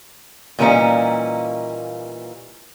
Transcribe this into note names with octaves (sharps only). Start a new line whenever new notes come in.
A#2 E3 G3 A#3 C#4 D#4